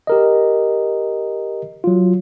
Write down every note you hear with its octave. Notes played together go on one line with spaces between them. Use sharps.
G4 A#4 D#5
F#3 F4